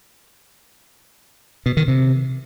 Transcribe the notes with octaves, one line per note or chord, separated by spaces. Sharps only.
B2
D#3
C3